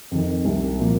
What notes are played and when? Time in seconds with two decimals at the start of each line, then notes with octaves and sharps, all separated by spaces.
0.11 F2 D#3
0.45 C2
0.79 A#2 F3 A#3